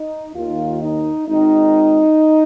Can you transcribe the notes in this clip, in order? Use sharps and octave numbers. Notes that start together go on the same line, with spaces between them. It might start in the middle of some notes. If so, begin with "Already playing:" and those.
Already playing: D#4
D#2 D#3 F4
D#4
G#1 G#2 D#3 D#4